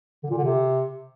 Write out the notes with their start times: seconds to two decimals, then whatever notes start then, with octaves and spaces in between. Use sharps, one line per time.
0.24 D3
0.30 A#2
0.37 D3
0.44 C3